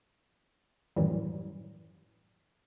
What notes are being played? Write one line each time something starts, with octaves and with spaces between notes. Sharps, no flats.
F#2 A2 D#3 E3 F#3 G3